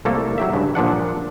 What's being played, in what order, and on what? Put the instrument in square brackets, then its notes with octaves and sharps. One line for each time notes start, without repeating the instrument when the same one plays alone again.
[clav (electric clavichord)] C2 A3 A#3 A4
F#3 G4 E5
G2 C#3
A#2 F3 D4 F#5